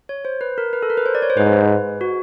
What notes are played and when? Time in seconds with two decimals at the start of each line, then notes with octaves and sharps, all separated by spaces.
0.09 C#5
0.25 C5
0.41 B4
0.58 A#4
0.73 B4
0.83 A4
0.90 A#4
0.97 B4
1.06 C5
1.15 D5
1.22 C#5
1.30 C5
1.37 G#2 B4
2.01 F#4